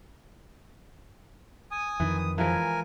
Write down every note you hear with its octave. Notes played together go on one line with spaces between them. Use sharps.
G#5 D#6
F2 D#3 E3
D#6
E3 F3 G#3 A#4 G#5